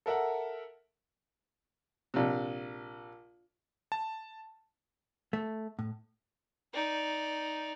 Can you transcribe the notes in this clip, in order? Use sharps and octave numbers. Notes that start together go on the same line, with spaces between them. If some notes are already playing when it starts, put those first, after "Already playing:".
A4 A#4 E5 F#5
A#1 C3
A5
A3
A2
D#4 D5